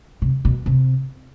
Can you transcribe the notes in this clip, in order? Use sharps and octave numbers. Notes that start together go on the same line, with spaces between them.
C3
B2
C3